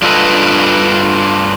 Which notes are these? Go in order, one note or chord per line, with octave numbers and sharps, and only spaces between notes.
G2 D4 F4 A4 B4 D#5